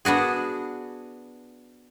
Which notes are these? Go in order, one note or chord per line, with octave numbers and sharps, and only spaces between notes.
B3 D4 F#4 G#4